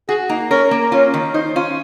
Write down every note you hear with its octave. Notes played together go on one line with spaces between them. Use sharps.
F#4 G#4
A#3 D#4
C#4 A#4
A#3
C#4 F4
D#3
D#4 C5
C#4 F4